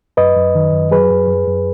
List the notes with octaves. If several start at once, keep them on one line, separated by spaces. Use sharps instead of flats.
F#2 B4 D#5
F#2
D#3
F#2
F#3 G#4 B4
F#2
F#2
F#2